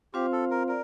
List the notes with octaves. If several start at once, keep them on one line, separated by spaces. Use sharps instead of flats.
C4 F4 G4 C5 F5
A4
A#4
A#4 D5